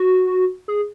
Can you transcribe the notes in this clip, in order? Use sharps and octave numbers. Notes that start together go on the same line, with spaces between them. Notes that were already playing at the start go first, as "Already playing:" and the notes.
Already playing: F#4
G#4